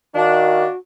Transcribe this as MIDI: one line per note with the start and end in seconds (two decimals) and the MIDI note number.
0.15 0.64 51
0.15 0.68 62
0.15 0.77 66
0.15 0.65 77